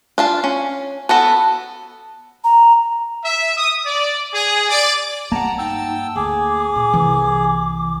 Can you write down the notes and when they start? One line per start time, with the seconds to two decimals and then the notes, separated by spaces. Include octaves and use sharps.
0.18 D4 F4 A5
0.44 C#4
1.09 B3 F#4 A4 A5
2.44 A#5
3.24 E5
3.57 D#6
3.86 D5
4.33 G#4
4.69 D5
5.32 G3 A#3 F#5 A5 A#5
5.59 G2 D#4 G5 A5 E6
6.16 D2 G#4 D6
6.76 A#2
6.93 C2 E3 A#3